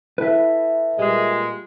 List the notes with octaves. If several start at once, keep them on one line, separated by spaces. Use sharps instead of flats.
E4 A4 B4 E5
A#2 G3 G#3